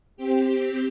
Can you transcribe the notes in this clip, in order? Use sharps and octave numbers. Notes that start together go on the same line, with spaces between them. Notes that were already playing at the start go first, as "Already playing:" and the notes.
C4 G4